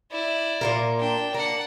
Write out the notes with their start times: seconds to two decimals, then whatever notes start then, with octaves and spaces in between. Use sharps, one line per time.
0.11 E4 D5
0.61 A#2 F4 A#4
0.99 D4 G5
1.34 A#3 D5 F#5